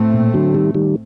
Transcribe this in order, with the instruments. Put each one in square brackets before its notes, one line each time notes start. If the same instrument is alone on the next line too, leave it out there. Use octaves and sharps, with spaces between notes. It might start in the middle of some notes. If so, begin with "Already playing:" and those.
Already playing: [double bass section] A2 A3 C4
[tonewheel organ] A#2
D3 F#3
D#3 G3
D#3 G3